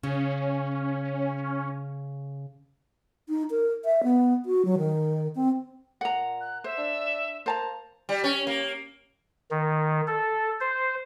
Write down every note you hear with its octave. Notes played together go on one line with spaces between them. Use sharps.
C#3 C#4
D#4
A#4
E5
B3
F#4
F#3
D#3
C4
A#2 F#5 A#5
F#6
C5 E5
D4
A#3 C5 A5 A#5
G3
C#4
A#3
D#3
A4
C5